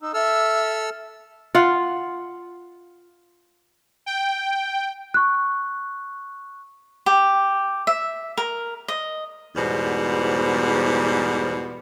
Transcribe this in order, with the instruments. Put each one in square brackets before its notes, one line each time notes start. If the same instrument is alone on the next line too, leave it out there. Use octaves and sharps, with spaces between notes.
[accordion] D#4 [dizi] E6
[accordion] A4 E6 F6 [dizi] E5
[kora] F4 F5 F#5
[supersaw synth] G5
[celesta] C#6 F#6
[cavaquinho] G4
E5
A#4
D#5
[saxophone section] E2 G#2 B2 G3 C5